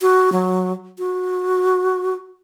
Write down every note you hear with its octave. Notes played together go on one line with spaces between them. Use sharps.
F#4
F#3
F#4